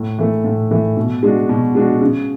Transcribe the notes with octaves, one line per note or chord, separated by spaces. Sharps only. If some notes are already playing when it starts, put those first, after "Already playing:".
Already playing: A2
E3 A3
A2
E3 A3
B2
G#3 D4 F#4
B2
G#3 D4 F#4
C#3